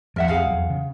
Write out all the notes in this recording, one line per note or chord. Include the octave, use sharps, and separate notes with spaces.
E2 F3 A#4 E5 F#5
F2 C4 G#4 F5 F#5
E2 F#3
C#3